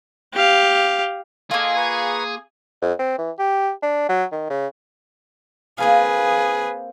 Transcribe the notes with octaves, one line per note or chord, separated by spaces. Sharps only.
G4 F5
A#3 F4 G#4 A4 D#5
B4 A#5 C#6
F2
C4
E3
G4
D4
F#3
D#3
C#3
A#3 C4 G#4 B4 F5